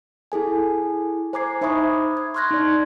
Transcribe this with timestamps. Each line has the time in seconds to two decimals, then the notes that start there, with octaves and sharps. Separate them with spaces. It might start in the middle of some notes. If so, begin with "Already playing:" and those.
0.32 E4 G#4 A4 G#5
1.33 C5 G#5 A#5 D6 G#6 C7
1.61 D#4 C5 E5 B5 C#6 D#6
2.17 G#6
2.34 C6 C#6 F6 F#6 G#6 A#6
2.51 D#4 D5